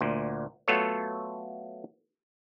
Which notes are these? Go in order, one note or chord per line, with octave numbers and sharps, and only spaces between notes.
D2 A#2
F#3 A3 B3 F4 A4 C#5